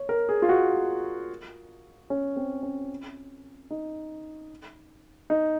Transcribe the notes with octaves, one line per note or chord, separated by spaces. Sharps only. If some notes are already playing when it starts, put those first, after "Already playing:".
Already playing: C#5
A#4
G#4
F4
F#4
C#4
C4
C#4
D#4
D#4